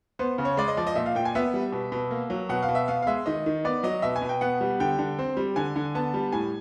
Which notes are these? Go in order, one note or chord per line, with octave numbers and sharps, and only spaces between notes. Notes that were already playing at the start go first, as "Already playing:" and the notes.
B3 C5
C#3
C#5
G#3 D5
D#5
F3 D5
D#5
A#2 E5
F5
A#2 G5
G#5
B3 E5
G3
B2
B2
A#3
F#3
B2 F#5
F5
B2
E5
B3 F5
F5
G#3 E5
D#3 D#5
D#3
B3 D5
F#3 D#5
B2 E5
G#5
B2
G5
B3 F#5
G3
D3 G5
D3
C4
G3
D3 G#5
D3
B3 A5
G3
A2 G#5